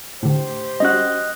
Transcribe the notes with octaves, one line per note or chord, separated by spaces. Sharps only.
A2 D3 G4 C5
G3 C#4 F#4 D#5 F#6